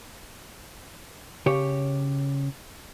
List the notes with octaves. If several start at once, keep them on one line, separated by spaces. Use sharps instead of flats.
C#3 G4 C#5